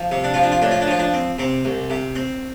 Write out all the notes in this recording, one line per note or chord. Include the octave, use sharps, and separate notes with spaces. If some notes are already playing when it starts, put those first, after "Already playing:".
Already playing: F3
C3
D4
F3 F4
D4
F4
A2 D4
F4
D4
F3 F4
D4
C4
C3 C4
C2
C3
C4